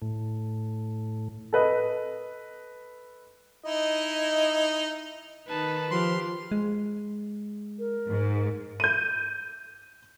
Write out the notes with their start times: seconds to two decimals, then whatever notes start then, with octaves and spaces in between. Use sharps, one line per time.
0.02 A2
1.53 A4 B4 D#5
3.65 D#4 E4 D#5
5.48 D#3 D#4 B4 A5
5.91 F3 G4 C6 F6
6.51 G#3
7.79 A#4
8.08 G#2
8.80 G6 D#7